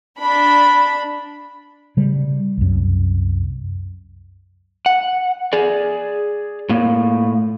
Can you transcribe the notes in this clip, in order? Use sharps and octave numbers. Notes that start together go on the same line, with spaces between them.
D4 B5
C#3 G3
C2 F#2
F#5
G#4 D5
A2 A#3